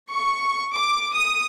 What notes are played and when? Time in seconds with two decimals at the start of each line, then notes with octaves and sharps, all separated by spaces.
0.11 C#6
0.73 D6
1.15 D#6